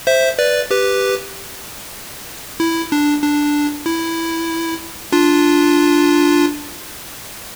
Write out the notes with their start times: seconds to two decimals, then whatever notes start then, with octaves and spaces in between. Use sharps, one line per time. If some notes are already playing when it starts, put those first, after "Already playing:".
0.07 C5 E5
0.39 B4 D5
0.71 G4 B4
2.60 E4
2.92 D4
3.22 D4
3.86 E4
5.12 D4 F4